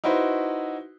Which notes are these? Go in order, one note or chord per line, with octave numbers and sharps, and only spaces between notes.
D#4 E4 F#4 B4 C5